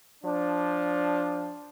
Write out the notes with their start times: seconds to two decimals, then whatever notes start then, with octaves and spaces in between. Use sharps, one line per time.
0.24 F3 D4